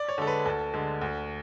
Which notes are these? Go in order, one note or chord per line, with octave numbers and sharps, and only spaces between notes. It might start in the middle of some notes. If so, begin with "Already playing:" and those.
Already playing: D5
C#5
D3 G#3 A4
B4
D2 A4
D3 G#3
D2